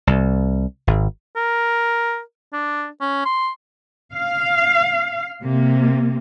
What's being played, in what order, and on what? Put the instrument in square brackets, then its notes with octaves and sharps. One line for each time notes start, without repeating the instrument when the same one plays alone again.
[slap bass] C2
G#1
[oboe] A#4
D4
C#4
C6
[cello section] F5
C3 A#3